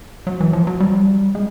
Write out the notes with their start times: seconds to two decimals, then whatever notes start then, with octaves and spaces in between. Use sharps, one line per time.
0.27 F#3
0.40 E3
0.53 F3
0.67 F#3
0.80 G3
1.35 G#3